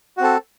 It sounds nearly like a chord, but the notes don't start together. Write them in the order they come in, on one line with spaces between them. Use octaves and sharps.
F#4 C4 A4